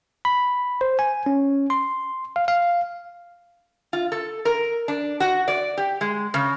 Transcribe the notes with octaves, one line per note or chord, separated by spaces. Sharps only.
B5
C5
G#5
C#4
C6
F5
F5
F4
A4
A#4
D4
F#4
D5
G4
G#3
C#3